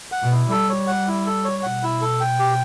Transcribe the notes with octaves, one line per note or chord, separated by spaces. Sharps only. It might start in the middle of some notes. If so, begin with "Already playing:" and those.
F#5
B2
E4
G3 A4
C#5
F#5
E4
A4
C#5
B2 F#5
E4
A4
G5
G4